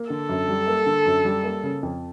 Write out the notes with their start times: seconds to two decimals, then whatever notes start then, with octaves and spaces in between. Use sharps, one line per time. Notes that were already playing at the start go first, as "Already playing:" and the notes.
Already playing: A#3
0.10 D3 A4
0.29 F#2
0.48 G3
0.68 A#3
0.86 D3
1.06 F#2
1.25 G3
1.44 A#3
1.63 C#3
1.83 F2